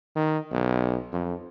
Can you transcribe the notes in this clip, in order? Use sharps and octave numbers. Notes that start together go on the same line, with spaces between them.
D#3
B1
F2